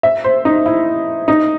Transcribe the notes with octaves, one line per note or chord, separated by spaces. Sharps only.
E5
C5
D#4
E4
D#4